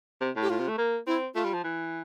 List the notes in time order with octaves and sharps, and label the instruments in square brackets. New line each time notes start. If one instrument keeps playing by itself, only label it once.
[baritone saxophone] C3
A2
[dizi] G4
[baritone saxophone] A2 [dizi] F4
[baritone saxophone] C3
A3
A#3
[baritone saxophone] C4 [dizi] E4
[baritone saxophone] A3 [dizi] F4
[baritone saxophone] G3
F3
E3